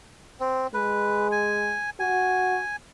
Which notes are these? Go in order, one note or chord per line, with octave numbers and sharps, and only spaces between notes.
C4
G#3 B4
G#5
F#4 G#5